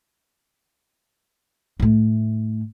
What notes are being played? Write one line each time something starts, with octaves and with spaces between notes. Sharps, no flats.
A2 A3